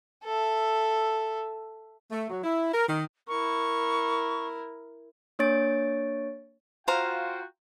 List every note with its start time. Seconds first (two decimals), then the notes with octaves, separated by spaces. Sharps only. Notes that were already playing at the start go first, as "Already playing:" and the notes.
0.24 A4 E5
2.11 A3
2.30 F#3
2.44 E4
2.74 A#4
2.88 D#3
3.28 E4 A#4 C#6
5.39 A#3 D4 C#5 C#6 A6 D7
6.88 F4 F#4 C5 F5 G5 A#5